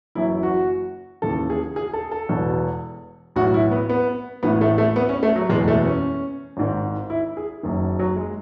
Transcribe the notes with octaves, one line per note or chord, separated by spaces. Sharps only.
F#1 F#2 E3 E4
F#4
D#2 C#3 E3 A4
G#4
G#4
A4
A4
E1 E2 B2
B1 A2 E3 F#4
E4
B3
B3
A1 A2 E3 B3
A3
A3
B3
C#4
A3
F#3
F#1 E2 B2 G#3
A3
C#4
G#1 G#2 D#3
E4
G#4
F#1 F#2 D#3
F#3
G#3